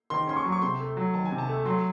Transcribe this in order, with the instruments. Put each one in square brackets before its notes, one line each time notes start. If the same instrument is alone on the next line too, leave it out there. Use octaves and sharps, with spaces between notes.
[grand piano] D#3 [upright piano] C6
[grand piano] C#4 [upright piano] C6
[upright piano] C#6
[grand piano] F#3
[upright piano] C#6
[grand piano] C3 [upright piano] C6
[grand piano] A3
F#3
[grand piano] D#3 [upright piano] A5
[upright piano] G#5
[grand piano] C3
[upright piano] A5
[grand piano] A3
[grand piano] F#3 [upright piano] C6